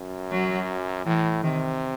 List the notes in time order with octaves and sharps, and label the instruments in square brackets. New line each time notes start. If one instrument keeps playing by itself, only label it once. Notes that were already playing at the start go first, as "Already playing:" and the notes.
Already playing: [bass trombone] F#2
[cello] F#3
[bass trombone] A2 [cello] E3
[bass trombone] C3 [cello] D#3